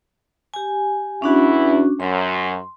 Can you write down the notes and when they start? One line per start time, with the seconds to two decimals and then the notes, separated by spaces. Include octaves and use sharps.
0.54 G4 G#5
1.22 E2 C#4 D4 E4 F#4
2.00 F#2 C6